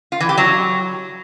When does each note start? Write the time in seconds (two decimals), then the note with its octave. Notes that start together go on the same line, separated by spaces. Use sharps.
0.12 F4
0.20 E3
0.29 G4
0.37 F#3